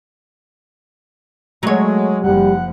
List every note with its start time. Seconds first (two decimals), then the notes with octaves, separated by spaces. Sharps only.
1.63 F#3 G#3 A3 C#5
2.23 F#1 F3 G3 F#5